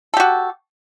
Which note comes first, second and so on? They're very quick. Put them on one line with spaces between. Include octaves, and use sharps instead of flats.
A4 G4 F#4